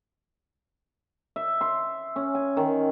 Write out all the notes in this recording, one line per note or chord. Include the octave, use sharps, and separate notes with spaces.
E5
C6
C#4
G#5
D#3